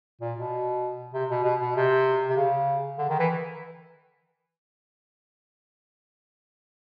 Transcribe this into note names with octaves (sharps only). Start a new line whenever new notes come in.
A#2
B2
C3
B2
B2
B2
C3
C3
C#3
D3
D#3
E3